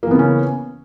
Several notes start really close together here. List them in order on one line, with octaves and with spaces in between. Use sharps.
A#3 E3 B3 C#3 C#4